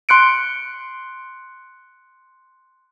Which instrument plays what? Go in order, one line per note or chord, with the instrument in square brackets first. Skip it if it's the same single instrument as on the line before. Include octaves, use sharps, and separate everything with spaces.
[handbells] C6 F#6 C#7 D7